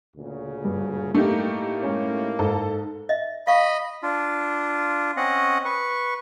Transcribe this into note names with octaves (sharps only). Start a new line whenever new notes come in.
D2 A#2 C#3
G2
A2 A3 A#3 D#4 G4
G#3 C#4
G#2 A4
D#5 E5
D#5 F5 B5 C#6
D4 F4
C4 C#4 D#5 F#5
B4 C#6